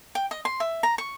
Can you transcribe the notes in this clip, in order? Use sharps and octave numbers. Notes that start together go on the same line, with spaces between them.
G5
D#5
C6
E5
A#5
C#6